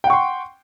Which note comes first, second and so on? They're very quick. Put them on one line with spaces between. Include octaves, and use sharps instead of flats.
G5 F#5 C#6 C6